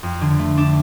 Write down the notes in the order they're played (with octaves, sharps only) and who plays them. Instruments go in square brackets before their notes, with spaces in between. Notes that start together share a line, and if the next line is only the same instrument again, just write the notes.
[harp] F2
D3
A3
D4